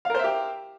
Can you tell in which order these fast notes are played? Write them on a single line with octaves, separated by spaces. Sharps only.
F5 A#4 C5 E5 G4